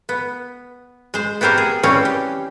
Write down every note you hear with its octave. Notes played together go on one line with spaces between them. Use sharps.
B3
G#3 C5
B3 C4 G4 A#4 C5
G#4
E3 G3 C4 C#4 C#5 F5
G4